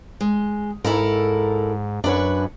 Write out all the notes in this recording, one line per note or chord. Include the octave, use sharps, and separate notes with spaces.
G#3
G#2 E4 A4 A#4
F#2 D4 B4 C#5